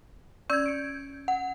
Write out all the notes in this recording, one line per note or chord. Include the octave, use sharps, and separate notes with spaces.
C#4 D5 E6 G6 G#6
C#7 D7
F#5